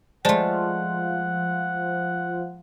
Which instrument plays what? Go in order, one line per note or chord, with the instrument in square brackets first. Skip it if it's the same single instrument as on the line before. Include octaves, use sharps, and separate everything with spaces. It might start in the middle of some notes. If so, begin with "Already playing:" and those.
[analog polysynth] F3 F4 [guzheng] G#3 A3 [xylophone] C5 D5 A5 [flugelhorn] F#5